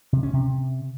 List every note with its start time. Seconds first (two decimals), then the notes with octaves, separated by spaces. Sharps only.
0.13 C3
0.23 C#4
0.33 C3